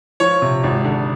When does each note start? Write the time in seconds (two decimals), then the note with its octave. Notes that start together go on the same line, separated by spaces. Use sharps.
0.20 F3 C#5
0.42 C3
0.64 G#1
0.85 D3